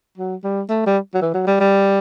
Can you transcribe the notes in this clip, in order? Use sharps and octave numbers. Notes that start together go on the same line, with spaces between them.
F#3
G3
A3
G3
F#3
E3
F#3
G3
G3